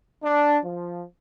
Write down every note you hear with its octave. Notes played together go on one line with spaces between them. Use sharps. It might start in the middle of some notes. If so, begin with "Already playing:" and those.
D4
F3